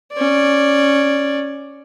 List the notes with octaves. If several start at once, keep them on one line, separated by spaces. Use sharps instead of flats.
C#4 D5